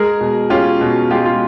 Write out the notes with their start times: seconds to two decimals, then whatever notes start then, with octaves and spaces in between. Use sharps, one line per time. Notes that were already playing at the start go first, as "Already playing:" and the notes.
Already playing: G#3 G#4 A#4
0.21 B2
0.50 C#4 F4 G4
0.80 B2
1.10 G#3 F4 G4
1.25 F4